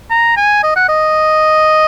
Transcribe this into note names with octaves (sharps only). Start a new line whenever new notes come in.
A#5
G#5
D#5
F#5
D#5